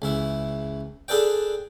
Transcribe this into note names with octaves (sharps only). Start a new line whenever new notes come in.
C#2 E3 E4
D4 G#4 A4 B4 D5 G5